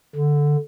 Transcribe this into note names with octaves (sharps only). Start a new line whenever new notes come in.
D3